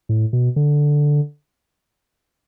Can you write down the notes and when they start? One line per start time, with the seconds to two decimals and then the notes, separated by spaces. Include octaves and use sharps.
0.09 A2
0.33 B2
0.56 D3